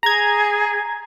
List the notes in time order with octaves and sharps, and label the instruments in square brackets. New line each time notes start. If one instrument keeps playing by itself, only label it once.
[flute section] G#4 [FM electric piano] A#5 G#6